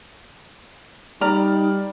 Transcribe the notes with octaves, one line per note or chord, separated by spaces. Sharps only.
G3 D#4 D5 A#5 F6